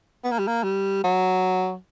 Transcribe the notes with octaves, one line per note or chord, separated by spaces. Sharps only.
B3
A#3
G3
A#3
G3
F#3